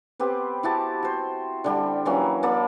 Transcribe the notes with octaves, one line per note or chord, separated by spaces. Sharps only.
B3 C4 G4 B4
E4 F#4 G4 A5
F#4 C5
D3 G3 G5
E3 F#3 A#3 C#4
A#3 A4 D5 B5